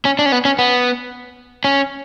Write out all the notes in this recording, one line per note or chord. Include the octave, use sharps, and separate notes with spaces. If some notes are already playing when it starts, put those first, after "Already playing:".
C#4
D4
C#4
B3
C#4
B3
C#4